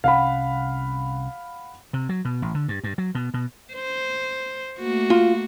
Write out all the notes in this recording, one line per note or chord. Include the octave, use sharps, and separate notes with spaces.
C2 C3 C#4 F5 F#5 B5
C3
F#3
B2
A1
D3
G2
G2
F#3
B2
B2
C5
A3 A#3 F#4
F4